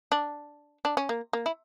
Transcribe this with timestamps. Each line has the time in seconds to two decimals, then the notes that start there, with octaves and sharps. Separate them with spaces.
0.12 D4
0.85 D4
0.97 C#4
1.09 A#3
1.33 A#3
1.46 E4